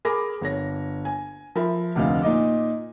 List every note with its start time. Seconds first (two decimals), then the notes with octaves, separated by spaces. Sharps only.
0.05 G#4 A#4 G#5 B5 D6 A#6
0.41 G1 C#5 A#6
1.05 G#5
1.56 F3 A#4 E5 B5
1.95 F1 D2 C3 D#5 F5
2.22 A#2 D#4 D#5 D6